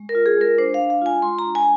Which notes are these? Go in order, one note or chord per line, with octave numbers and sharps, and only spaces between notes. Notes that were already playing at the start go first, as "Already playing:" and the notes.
Already playing: G#3
A#4
F4
G#4
G#3 A#4
D4 C5
F5
G#3
F5
F4 G#5
G#3 C6
A#5
D4
G#5